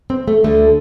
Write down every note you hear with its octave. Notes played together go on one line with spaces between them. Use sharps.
C4
A3
D2 D3 A3